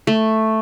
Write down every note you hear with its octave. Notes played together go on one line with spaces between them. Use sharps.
A3